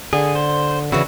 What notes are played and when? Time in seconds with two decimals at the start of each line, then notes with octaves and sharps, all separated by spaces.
0.13 D3 G#4
0.35 C5
0.92 C#3 E3 D4 E4 F#4